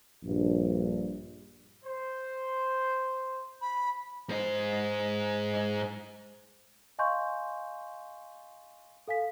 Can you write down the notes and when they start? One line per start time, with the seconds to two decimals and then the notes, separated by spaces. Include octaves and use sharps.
0.24 A#1 G2
1.85 C5
3.62 B5
4.29 G#2 C5
6.99 D#5 F5 G#5 C6 C#6 G6
9.08 A4 F5 G#5 B6